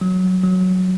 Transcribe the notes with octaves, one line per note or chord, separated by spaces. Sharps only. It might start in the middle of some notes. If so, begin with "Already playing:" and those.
F#3
F#3